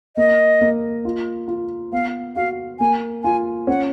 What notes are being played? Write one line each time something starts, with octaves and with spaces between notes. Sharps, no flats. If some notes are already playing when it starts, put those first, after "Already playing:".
A#3 D#5
A#3
F4
F4
B3 F5
F#4 F5
A#3 G#5
F4 G#5
C#4 F#5